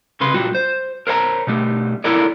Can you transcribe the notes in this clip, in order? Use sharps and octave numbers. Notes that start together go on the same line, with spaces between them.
C2 C#3 B4 C6
A#2 G3 F4 F#4
C5
A#4 C5 C#5 F#5 A#5
B2 G3 A3
E4 A4 A#4 C#5 D5